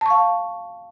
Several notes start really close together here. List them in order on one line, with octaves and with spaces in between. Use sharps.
A5 C#6 F5